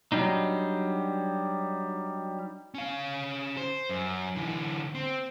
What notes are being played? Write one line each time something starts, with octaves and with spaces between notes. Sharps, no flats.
F#3 G3 D4 D#4
C#4 F5
C5
F#2
D3 E3
C4